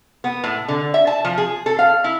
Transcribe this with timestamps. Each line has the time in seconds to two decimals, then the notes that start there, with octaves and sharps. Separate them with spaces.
0.24 B3
0.44 A2
0.68 D3
0.94 E5
1.07 A5
1.25 F3
1.38 G#4
1.66 A4
1.79 F5
2.04 E4